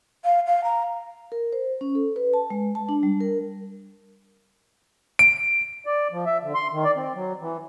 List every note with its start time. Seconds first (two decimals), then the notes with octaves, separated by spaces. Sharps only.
0.24 F5
0.46 F5
0.64 A#5
1.32 A#4
1.53 C5
1.81 C#4
1.95 A4
2.16 B4
2.34 A5
2.50 G#3
2.75 A5
2.89 D4
3.03 G3
3.21 A#4
5.19 D7
5.86 D5
6.12 F3
6.26 E5
6.43 D3
6.55 C6
6.73 D#3
6.84 D5
6.96 C4
7.15 F#3
7.41 E3